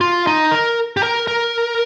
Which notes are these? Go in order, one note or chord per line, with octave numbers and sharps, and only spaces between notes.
F4
D#4
A#4
G4
A#4
A#4